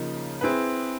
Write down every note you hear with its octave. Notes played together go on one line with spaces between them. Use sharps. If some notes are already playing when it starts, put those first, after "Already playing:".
Already playing: C#3 F3 A#3 D#4
C4 E4 G#4 B4